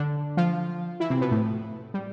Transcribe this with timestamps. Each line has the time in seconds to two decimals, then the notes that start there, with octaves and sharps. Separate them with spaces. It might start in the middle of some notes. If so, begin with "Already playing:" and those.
Already playing: D3 D4
0.37 F3 F4
1.00 E3 E4
1.10 C3 C4
1.21 B2 B3
1.31 A2 A3
1.94 G3